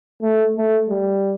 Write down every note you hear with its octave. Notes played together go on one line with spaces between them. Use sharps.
A3
A3
G3